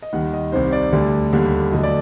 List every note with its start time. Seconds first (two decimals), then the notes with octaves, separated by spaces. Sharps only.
0.02 D#5
0.13 D#2 D#3 G3 F#5
0.33 D#5
0.52 C2 C3 D#3 C5
0.73 D5
0.92 D2 D3 G3
1.33 D#2 D3 G3
1.72 D2 D3 F#3 D#5
1.83 D5